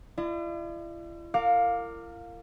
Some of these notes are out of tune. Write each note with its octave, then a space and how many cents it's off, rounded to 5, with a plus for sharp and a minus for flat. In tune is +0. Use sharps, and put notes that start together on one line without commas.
E4 +45 D5 +45
A#4 -30 F5 +15 D6 +0